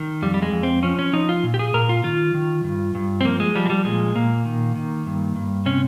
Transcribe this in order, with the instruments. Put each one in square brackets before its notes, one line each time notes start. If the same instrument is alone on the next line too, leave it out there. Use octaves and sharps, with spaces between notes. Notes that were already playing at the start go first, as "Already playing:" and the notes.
Already playing: [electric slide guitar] D#3
F2 G3
G3
G#3
F2
C4
F3 C#4
C#4
F3 D#4
F4
A#2
G4
G#4
A#2 A#4
F4
D#3 F4
D#3
G2
G2
C4
F3 A#3
G#3
F3 G3
G#3
G3
A#2 G#3
A#2 A#3
D#3
D#3
G2
G2
C3 C#4